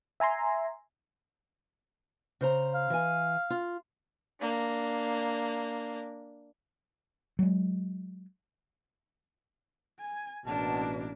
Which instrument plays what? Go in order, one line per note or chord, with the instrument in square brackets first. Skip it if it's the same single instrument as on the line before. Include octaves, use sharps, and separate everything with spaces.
[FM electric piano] E5 G#5 A#5 C6
[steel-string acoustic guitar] C#3 C5 A#5
[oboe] F5
[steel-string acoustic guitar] E3 G#5
F4
[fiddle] A#3 D4
[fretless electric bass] F#3 G#3
[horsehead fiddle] G#5
[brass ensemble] A1 B2 [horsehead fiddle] A#3 D4 [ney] A5